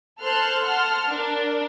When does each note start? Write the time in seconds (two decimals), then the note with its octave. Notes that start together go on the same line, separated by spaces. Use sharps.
0.22 A4 C5 A5 C6 F6 F#6
0.63 F#5 A5 C6 F6
1.09 D4 A#4